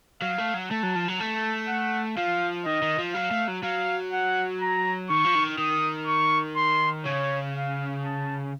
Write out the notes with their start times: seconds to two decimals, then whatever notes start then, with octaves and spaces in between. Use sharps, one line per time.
0.22 F#3 F5
0.38 A3
0.54 F#3
0.71 A3 A5
0.83 F#3
0.95 F3
1.08 F#3
1.19 A3 A5
1.68 F#5
2.17 F3 F5
2.66 D#3 D#5
2.82 D#3
2.99 F3
3.14 F#3 F5
3.31 A3
3.48 F#3
3.63 F#3 F5
4.13 F#5
4.61 A#5
5.10 D#3 C#6
5.25 F3
5.35 D#3
5.58 D#3 D#6
6.07 C#6
6.56 C6
7.05 C#3 C#5
7.54 F5
8.03 A5